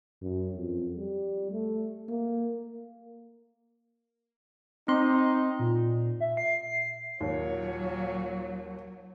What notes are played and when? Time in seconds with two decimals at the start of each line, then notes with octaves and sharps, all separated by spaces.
0.22 F#2
0.56 F2
0.98 G3
1.52 A3
2.09 A#3
4.88 C4 D#4 C6
5.59 A#2
6.21 E5
6.37 C7
7.20 D#2 A#2 F#3 C#5